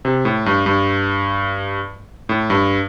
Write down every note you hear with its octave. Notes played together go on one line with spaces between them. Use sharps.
C3
A2
G2
G2
A2
G2